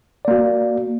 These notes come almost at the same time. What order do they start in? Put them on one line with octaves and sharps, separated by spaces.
D5 A#3 F#4